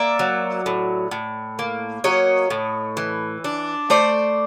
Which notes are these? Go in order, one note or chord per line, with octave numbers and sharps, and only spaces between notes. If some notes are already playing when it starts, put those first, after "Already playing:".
Already playing: A#3 D5 E5
F#3
A2
A2
A#3
F#3 C#5 D#5
A2
E3
D4
A3 C5 D5